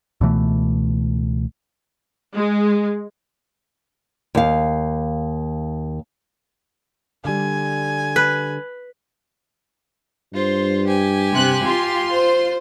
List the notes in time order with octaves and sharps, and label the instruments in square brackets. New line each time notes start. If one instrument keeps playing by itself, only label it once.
[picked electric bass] C#2 B2 E3 A3
[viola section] G#3
[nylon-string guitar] D#2 F5
[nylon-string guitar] D3 G3 [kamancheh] G#5
[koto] B4
[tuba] G2 [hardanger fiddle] F4 C5
[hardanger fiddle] G4 G#5
[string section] C3 F#6
F4 C6
[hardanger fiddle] C5